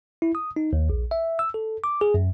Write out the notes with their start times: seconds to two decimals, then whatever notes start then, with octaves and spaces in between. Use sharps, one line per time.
0.22 E4
0.35 D#6
0.56 D#4
0.73 D#2
0.89 A#1
1.11 E5
1.39 E6
1.54 A4
1.84 D6
2.01 G#4
2.14 F#2